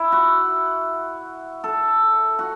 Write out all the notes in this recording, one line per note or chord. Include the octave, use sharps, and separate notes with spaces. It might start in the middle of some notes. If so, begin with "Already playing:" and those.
Already playing: E4
F#4
A4
F#4